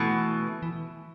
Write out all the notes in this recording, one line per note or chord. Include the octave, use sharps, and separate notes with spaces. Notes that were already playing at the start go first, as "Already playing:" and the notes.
Already playing: B2 E3 A3
E3